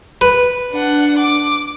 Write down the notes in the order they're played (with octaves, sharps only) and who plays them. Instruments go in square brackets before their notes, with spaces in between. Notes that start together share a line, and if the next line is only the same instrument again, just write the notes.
[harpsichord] B4
[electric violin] D4 F#5
D6